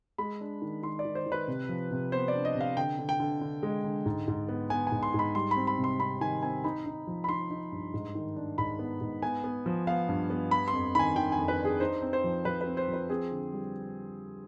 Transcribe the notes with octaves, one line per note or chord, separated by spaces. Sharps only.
G#3 B5
D4
D#3
D#3 C6
D5
D#3
C5
D#3
B4
C3
F3
C3
B3 C5
D5
D4
D#5
C3
F5
D3 G5
D3
G5
D3
D3
G#3
D3
G#2
G#2
B3
B3 G#5
G#2 G#5
C6
G#2
B5
G3 C6
C4 B5
B5
C3
C6
C4 B5
D#3 G#5
C4 G#5
D#4 B5
D#4
F3
B5
D#4 C6
D#4
G2
G#2
D#3
D4
G#2 B5
B3
G#2
B3 G#5
B3
F3
B3 F5
G2
B3
B3 B5
C6
F2
D#3 G#5 B5
D#3 G5
G#5
F2
B4
D4
G#4
D#4 C5
C4
C5
F3
F3 B4
B4
C4
C5
F3
B4
C4 G#4
D3
G3